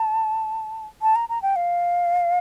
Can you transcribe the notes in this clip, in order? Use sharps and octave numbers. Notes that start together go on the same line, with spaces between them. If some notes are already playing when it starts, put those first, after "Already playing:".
Already playing: A5
A5
A#5
A#5
G5
F5